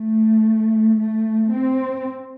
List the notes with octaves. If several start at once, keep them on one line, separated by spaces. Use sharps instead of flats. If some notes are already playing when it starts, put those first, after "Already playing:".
Already playing: A3
A3
C4